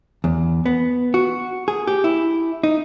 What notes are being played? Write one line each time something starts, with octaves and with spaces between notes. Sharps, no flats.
E2
B3
F#4
G#4
G4
E4
D#4